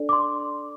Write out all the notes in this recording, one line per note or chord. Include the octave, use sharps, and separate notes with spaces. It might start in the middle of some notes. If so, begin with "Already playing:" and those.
Already playing: D4 A4 D5
D6
C6